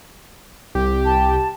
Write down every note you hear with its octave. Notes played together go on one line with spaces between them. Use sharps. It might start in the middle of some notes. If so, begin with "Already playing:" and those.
C2 G4
A5